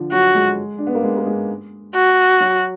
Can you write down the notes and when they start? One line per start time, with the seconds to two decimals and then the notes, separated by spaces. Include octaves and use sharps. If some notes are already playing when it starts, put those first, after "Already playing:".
Already playing: D3 F3
0.12 F#3 F#4
0.35 G#3
0.78 D4
0.87 B3
0.95 A#3
1.04 G#3
1.17 A#3
1.26 G#3
1.95 F#4
2.40 F#3